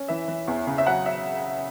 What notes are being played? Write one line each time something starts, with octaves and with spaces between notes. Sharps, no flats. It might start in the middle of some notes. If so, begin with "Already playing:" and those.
Already playing: C#4
E3 E5
E3
E2
C#3
E5
F#3 F#5
E5